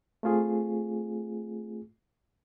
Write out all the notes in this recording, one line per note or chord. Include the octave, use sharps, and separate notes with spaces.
A3 C4 F4 G#4